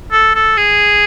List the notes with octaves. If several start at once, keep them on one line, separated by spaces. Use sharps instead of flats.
A4
A4
G#4